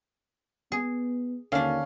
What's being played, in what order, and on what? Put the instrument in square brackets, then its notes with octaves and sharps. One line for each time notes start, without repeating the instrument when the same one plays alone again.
[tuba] B3 [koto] G#4
[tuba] D#2 [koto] D3 D4 [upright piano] C#4 F5